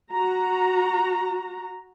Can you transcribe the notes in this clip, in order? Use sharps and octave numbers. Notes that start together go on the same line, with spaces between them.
F#4 A#5